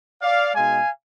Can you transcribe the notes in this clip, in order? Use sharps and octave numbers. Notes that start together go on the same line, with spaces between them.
D5 F5
B2 G#3 D#4 F5 G#5